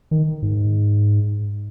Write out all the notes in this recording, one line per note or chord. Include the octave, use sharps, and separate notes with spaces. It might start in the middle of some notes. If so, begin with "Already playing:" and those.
D#3
G#2